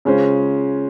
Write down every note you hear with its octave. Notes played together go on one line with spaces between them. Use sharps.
C#3 G#3 C#4 F4 C5